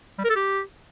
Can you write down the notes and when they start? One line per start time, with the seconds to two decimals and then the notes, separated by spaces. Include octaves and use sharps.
0.19 G3
0.24 A#4
0.30 A4
0.35 G4